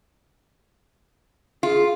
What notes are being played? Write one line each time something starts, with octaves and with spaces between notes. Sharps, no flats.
F4 G#4